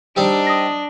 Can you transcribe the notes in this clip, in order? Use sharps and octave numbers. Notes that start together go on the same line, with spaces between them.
G3 C4 D4 D#4
D#6 A#6